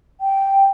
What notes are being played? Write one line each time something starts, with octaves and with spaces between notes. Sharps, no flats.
G5